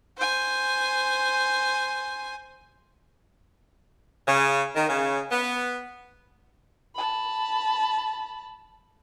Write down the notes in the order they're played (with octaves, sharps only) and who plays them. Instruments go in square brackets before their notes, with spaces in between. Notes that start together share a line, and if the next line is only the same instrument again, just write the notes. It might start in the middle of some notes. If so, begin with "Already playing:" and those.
[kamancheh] C5 G#5
[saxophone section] C#3
D#3
C#3
B3
[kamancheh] A5 B5